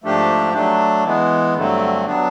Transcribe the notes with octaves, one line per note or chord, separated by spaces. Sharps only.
G#2 F3 A3 D4 G4
F#3 A3 D4
E3 G#3 B3
G2 D3 F#3 A3 C4
F#3 B3 D4